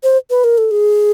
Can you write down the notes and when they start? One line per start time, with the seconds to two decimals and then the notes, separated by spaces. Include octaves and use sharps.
0.03 C5
0.30 B4
0.44 A#4
0.58 A4
0.71 G#4